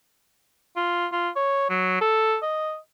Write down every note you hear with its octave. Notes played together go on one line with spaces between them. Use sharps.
F4
F4
C#5
F#3
A4
D#5